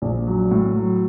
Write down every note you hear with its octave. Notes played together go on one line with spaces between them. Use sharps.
A#1
F#3
A2
F#3